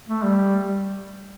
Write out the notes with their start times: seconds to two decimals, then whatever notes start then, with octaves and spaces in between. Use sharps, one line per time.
0.08 A3
0.23 G3